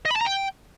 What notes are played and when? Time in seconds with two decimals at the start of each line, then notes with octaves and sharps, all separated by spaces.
0.05 D#5
0.11 B5
0.16 A5
0.21 A#5
0.26 G5